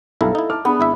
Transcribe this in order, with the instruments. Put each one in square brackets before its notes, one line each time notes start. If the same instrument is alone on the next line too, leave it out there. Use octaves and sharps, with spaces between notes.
[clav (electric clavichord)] B1 G2 E4 [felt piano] A4 F5 A#5
[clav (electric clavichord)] D#4 E4
[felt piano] A5 D6 F6
[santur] B3 [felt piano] D4 G#4
[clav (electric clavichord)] G#1 E4 E5